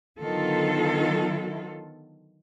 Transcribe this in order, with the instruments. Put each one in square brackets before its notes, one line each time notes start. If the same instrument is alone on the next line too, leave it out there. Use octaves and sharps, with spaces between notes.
[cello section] D3 D#3 F#3 B3 F4 A4